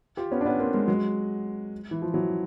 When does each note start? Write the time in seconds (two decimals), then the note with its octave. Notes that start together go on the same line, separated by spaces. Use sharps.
0.17 F4 G4
0.32 B3 C#4
0.41 D4
0.46 B3 C#4
0.59 A#3 C4
0.74 G#3 A#3
0.88 F#3 G#3
1.91 E3
2.02 F3
2.14 E3 F#3